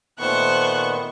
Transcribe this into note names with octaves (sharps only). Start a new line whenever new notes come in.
A#2 D#3 A3 B3 C5 C#6 F#6